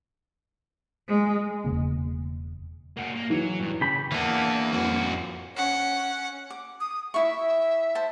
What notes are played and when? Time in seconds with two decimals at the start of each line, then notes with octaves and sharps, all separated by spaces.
1.08 G#3
1.65 E1 C#3 A#3
2.97 A#3 F#4
3.15 A#3
3.30 E3 F#3
3.60 G2
3.81 C#3 G4 B5
4.12 E3 A#3 B3 D4
4.73 F2 F#4
5.55 C#4 F#5
6.50 D6
6.80 D#6
7.14 E4 E5 C#6
7.95 C5 A5